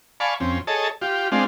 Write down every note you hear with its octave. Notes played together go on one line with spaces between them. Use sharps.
D5 F5 G#5 A5 B5 C#6
F2 C4 C#4
G#4 A4 C#5 D#5 A5
F4 G4
G#3 C4 D4 F4